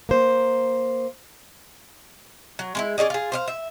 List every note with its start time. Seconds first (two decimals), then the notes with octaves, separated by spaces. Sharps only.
0.09 A#3 C5
2.59 F#3
2.75 G#3 A#3 E4
2.98 C#4 G#4 D5 D#5
3.10 F4 G#4
3.32 C5 D#5 F5
3.48 E5